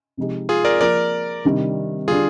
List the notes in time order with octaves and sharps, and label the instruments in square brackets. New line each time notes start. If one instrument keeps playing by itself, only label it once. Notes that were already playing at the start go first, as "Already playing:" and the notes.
[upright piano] C3 F3 G#3 D#4 G4
[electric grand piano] F4 G#4
A#4 D5
[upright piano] F3 A#3 F4 [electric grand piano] A#4 D5
[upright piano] C3 D#3 G3 D4
[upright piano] D3 G3 D4 [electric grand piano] F4 G#4